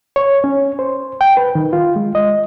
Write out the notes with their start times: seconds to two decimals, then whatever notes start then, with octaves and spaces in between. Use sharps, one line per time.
0.16 C#5
0.44 C#4
0.79 C5
1.21 G5
1.37 B4
1.55 D#3
1.73 F4
1.96 G#3
2.15 D#5